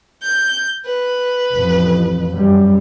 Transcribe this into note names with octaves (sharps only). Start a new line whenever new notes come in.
G6
B4
A1 F2
F#2 G3